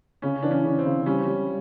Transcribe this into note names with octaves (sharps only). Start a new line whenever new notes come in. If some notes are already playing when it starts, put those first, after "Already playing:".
C#3 C#4
E3 D4
C#4
C#3
C4
C#3
G3 C#4
G3